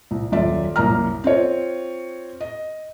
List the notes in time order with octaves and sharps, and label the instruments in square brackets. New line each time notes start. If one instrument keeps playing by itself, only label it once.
[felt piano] C2
D#1 F#2 F4 D5 E5
C2 F#2 A#3 A#5 F6
C4 F4 C#5
D#5